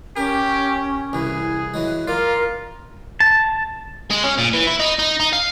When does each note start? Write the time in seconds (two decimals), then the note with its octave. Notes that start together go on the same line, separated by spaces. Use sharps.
0.17 C#4 G4 A#4
1.13 C2 E3 G#4
1.74 E3 F#3 G#3
2.08 F4 A#4 D5
3.20 A5
4.10 G#3
4.24 C#4
4.38 A#2
4.53 E3
4.67 E4
4.79 D#4
4.99 D#4
5.20 D#4
5.33 F5